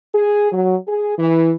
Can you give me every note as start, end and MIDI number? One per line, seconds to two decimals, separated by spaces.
0.14 0.51 68
0.52 0.75 54
0.86 1.16 68
1.18 1.52 52